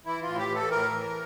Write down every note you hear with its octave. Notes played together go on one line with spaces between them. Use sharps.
E3 E4
F4
A2
G4
E3
A4
A2 A#4
E3